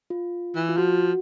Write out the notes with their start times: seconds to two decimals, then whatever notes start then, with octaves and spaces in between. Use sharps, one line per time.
0.10 F4
0.55 E3
0.69 F4
0.78 F3 F#4